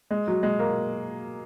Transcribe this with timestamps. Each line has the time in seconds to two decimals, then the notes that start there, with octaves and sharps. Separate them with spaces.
0.11 G#3
0.28 F#3
0.43 G#3
0.59 A#3